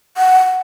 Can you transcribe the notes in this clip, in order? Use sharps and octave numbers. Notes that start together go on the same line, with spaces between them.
F#5